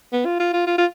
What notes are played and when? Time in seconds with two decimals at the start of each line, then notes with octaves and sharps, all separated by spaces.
0.13 B3
0.26 F4
0.40 F4
0.53 F4
0.67 F4
0.78 F4